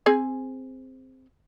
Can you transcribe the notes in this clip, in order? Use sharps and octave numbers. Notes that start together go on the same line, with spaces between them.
C4 G#4 G#5